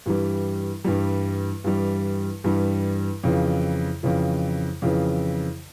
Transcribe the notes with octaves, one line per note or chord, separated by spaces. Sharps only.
G2 E3 G3
G2 E3 G3
G2 E3 G3
G2 E3 G3
F2 C#3 E3
F2 C#3 E3
F2 C#3 E3